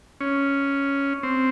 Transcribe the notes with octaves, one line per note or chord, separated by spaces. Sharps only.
C#4
C4